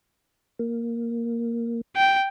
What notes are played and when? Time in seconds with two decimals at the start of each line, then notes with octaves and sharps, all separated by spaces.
0.59 A#3
1.96 G5